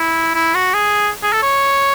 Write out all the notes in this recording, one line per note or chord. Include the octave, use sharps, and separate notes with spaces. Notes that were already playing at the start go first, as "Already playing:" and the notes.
Already playing: E4
E4
F#4
G#4
G#4
A4
C#5